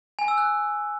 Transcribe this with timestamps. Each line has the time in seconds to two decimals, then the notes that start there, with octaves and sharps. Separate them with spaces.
0.19 G#5
0.28 E6
0.38 F#6